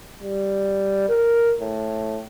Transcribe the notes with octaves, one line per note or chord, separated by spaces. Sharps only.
G3
A#4
A2